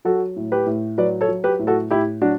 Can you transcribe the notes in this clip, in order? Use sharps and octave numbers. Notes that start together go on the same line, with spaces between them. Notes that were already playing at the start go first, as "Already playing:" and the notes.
F#3 F#4 A4
A2
G4 B4
A2
F#3 B4 D5
A4 C#5
F#3
G4 B4
A2
F#4 A4
A2 E4 G4
F#3 D4 F#4